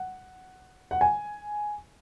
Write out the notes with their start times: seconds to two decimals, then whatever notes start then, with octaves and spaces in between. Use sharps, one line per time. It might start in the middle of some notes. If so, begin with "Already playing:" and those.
Already playing: F#5
0.91 F#5
1.01 G#5